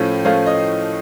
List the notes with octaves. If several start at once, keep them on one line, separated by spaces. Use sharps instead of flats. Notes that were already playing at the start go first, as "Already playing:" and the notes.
Already playing: A2 F3 A3 C#4
A2 F3 A3 C#4 F5
D#5